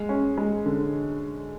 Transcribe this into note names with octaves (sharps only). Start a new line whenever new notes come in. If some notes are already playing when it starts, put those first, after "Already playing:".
Already playing: G#3
C#4
G#3
D3